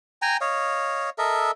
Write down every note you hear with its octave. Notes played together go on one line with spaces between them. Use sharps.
G5 G#5 A#5
C#5 D#5 F5
A4 A#4 D#5 E5